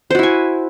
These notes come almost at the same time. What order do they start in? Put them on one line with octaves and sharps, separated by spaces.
C5 F#4 E4 G#5